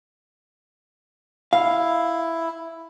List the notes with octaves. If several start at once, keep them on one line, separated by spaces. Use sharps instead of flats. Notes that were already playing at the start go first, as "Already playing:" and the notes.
E4 F5